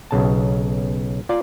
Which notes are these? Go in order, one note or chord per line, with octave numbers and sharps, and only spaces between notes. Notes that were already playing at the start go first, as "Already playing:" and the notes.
B1 C#3 A5
F4 D5